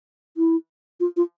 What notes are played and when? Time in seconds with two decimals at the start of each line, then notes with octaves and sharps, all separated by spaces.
0.37 E4
1.00 F4
1.17 F4